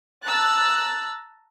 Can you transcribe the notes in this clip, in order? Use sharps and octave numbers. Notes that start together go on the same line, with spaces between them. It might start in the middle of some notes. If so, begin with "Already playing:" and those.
A5 A#5 E6 F#6 A6